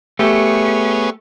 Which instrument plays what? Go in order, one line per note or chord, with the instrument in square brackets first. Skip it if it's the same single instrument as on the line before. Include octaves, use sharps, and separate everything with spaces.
[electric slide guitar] A3 G4 [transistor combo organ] B3 G#4 C#5